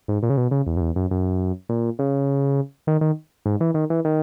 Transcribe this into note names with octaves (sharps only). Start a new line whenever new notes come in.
G#2
A#2
C#3
B2
C#3
E2
F#2
E2
F#2
F#2
A#2
C#3
D#3
D#3
G#2
E3
D#3
E3
D#3